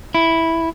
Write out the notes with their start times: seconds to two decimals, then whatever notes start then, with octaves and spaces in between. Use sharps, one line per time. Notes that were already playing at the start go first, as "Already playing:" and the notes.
0.14 E4